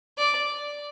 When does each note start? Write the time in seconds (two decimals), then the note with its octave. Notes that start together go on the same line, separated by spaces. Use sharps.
0.18 D5